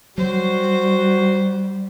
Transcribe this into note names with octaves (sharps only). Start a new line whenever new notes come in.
F#3 G3 F#4 C5